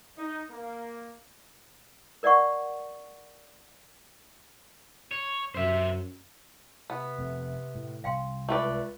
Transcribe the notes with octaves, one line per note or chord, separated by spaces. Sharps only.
D#4
A#3
A#4 D5 D#5 F#5 C#6
C#5
F#2 C5 E5
C3 B3
F1 A3 C4
A2
C2 F5 G5 C6
C#2 A3 B4 D5